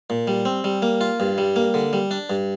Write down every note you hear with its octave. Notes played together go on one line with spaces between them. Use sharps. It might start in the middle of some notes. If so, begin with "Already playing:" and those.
A#2
G3
C4
G3
A#3
F4
G2
G3
A#3
D3
G3
D4
G2